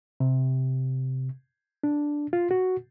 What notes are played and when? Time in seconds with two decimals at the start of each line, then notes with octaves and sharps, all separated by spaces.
0.20 C3
1.84 D4
2.33 F4
2.51 F#4